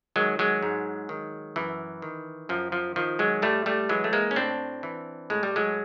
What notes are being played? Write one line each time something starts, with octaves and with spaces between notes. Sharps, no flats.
D#3 F#3 G#3
F#3 G#3
G#2
D#3
F#2 E3
D#3
F#2 F3
F3
D#3 F3
F#3 G#3
A2 G3 A3
G3 A3
E3 F#3 G#3
A3
G#3 A#3
C#4
A2 C4 D4
E3
A2 G#3
G3
F#3 G#3